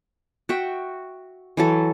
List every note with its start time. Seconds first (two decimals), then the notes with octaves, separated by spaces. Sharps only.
0.49 F#4 E5 G5
1.57 E3 F#3 A4